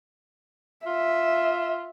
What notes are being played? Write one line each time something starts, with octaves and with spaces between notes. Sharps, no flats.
F4 E5